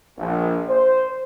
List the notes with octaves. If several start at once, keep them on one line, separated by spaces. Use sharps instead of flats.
A#1
C5